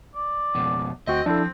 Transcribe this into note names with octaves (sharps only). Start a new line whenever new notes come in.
D5
F2 B2
D2 C4 F#4 D#5 G5
F3 C4 D4 E4 A4